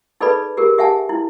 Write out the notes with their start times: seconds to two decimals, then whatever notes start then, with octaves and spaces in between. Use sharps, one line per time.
0.20 D#4 G#4 A4 B4 D5 B5
0.57 G4 G#4 A#4
0.78 G4 E5 F#5 G#5 A5
1.09 E4